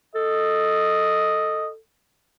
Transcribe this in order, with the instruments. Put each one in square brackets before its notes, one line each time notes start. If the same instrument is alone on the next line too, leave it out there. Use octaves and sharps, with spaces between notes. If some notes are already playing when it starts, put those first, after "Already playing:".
[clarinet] A4 [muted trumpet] D#5